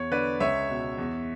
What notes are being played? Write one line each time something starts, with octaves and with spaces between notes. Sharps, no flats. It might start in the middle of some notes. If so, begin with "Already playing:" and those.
Already playing: E2 C#5
D3 B4 D5
C#2 C#5 E5
B2
E2